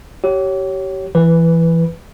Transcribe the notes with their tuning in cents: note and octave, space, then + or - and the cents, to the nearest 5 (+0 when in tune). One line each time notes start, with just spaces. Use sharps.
G4 -30 C#5 +5
E3 +20 B4 +0